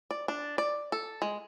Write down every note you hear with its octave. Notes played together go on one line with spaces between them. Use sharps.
D5
D4
D5
A4
G#3